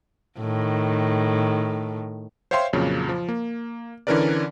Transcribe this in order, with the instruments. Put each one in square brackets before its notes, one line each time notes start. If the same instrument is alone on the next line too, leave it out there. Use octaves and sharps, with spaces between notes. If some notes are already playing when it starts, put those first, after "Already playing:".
[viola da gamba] A2 D#3
[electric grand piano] C5 C#5 E5 F5 G5 C6
F2 A#2 C#3 F#3
F3
A#3
D3 E3 C#4 A#4 B4 D5